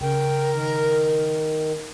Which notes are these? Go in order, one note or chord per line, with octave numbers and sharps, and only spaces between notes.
C#3 A#4 G5
D#3